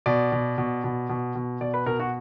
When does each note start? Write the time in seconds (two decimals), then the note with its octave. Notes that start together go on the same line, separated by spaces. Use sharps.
0.06 B2 D5
0.32 B2
0.58 B2
0.84 B2
1.09 B2
1.35 B2
1.60 B2 D5
1.74 B4
1.86 B2 A#4
1.99 F#4